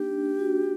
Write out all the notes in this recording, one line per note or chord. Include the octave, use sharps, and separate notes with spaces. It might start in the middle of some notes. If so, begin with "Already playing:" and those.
Already playing: A#3 D4 D#4 G4
D4
F#4